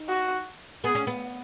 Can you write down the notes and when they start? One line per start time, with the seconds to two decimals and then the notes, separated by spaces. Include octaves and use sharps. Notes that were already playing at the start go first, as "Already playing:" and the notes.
Already playing: D#4
0.09 F#4
0.84 B3 G#4
0.95 C#4
1.07 B3